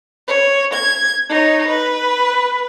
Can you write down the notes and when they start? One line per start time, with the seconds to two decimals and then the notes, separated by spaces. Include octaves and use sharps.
0.27 C#5
0.73 G#6
1.29 D#4 C#5
1.67 B4